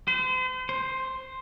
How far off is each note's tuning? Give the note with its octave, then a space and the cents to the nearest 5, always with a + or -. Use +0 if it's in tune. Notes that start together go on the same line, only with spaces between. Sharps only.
C5 -40
C5 +5